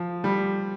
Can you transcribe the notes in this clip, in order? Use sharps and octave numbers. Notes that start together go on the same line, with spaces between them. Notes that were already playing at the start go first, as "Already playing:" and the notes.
Already playing: F3
G3